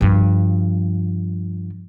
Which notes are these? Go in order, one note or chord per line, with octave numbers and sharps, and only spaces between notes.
G2 F3